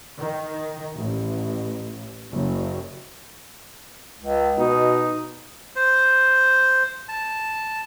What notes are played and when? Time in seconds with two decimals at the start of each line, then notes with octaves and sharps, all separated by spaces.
0.18 D#3
0.96 A1
2.33 F#1
4.20 C#2
4.58 B2 D#4
5.76 C5
7.09 A5